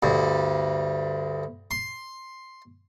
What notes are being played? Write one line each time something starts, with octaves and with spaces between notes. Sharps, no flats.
D2 G2
C6